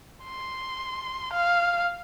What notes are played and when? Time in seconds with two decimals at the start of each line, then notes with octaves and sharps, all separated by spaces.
0.25 C6
1.33 F5